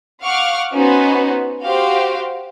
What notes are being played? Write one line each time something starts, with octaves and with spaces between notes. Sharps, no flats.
F5 F#5 C#6 D6 F6
B3 C#4 D#4 F#4 B4 C5
F#4 G4 C5 F5